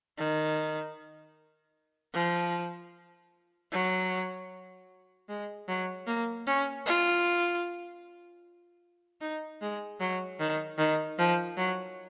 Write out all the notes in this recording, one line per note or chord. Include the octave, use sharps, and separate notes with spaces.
D#3
F3
F#3
G#3
F#3
A#3
C#4
F4
D#4
G#3
F#3
D#3
D#3
F3
F#3